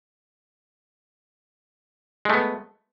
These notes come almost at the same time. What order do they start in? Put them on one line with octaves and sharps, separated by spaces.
G#3 A3 B3